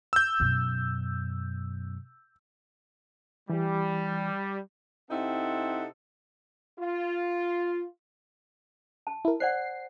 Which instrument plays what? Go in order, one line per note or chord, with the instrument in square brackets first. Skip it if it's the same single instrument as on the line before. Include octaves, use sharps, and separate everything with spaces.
[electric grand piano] E6 G6
[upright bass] F#2 B2
[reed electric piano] E3 G4 [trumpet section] G3
[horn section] C3 C4 D#4 E4 A4 F#5
[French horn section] F4
[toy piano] A5
[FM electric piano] E4 A#4
[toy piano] C5 D5 F#5 [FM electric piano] C7